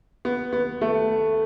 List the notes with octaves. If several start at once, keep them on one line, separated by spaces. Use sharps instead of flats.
B3
B3
A3